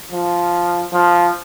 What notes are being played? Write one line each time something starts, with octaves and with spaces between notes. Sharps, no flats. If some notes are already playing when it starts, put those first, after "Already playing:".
F3
F3